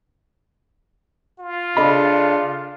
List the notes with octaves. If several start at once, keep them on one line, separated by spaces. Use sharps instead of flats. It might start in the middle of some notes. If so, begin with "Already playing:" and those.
F4
C#3 D4 A4 D#5 B5